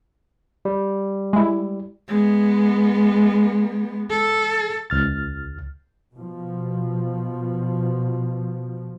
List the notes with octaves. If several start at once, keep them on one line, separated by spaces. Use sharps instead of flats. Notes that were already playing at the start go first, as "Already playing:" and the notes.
G3
G#3 E4
G#3 B3
A4
C#2 F6 A6
B2 F3